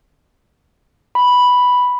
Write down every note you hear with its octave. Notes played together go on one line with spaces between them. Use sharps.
B5